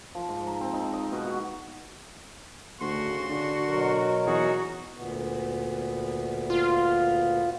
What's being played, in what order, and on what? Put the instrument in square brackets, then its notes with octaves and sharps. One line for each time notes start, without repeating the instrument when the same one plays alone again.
[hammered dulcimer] F3
G#2
A#5
C4
D#4
D#5
B2
F#4
[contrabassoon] D2 [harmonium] C#3 [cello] F#4 [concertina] C6
[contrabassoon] D3 [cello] F#4
[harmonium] B2 F#3 A#4
[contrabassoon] E2 [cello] D#4 F#4 [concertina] G#4
[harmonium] D2 A#2 B3
[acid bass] F4